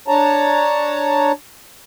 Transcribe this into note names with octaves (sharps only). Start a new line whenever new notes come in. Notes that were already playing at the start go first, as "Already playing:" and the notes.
D4 C#5 A5 A#5